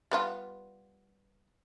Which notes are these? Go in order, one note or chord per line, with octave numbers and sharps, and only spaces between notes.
G3 B3 F4